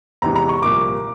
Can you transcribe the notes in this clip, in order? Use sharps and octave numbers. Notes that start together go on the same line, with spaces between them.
E2 C3 E3 G#3 A#5
A#5
C#6
C2 A#2 F3 A#3 D6